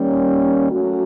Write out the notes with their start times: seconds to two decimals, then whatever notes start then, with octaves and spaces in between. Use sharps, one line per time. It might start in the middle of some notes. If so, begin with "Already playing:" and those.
Already playing: D#3 G3 A#3 C#4
0.70 F#3 A3 C#4 F#4